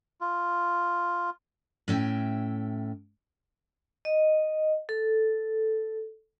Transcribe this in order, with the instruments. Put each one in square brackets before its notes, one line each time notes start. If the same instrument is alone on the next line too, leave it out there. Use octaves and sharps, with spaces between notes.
[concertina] F4
[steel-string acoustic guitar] A2 C#4 E5 G5
[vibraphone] D#5
A4